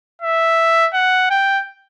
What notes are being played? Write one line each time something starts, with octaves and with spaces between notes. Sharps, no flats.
E5
F#5
G5